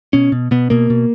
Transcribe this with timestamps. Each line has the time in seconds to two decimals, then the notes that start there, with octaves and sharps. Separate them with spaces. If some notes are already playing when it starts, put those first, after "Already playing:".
0.13 B2 C#4
0.32 B2
0.51 B2 B3
0.70 B2 A#3
0.90 B2